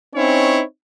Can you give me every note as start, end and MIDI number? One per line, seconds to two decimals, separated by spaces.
0.15 0.62 60
0.15 0.62 61
0.15 0.62 63
0.15 0.62 64
0.15 0.62 73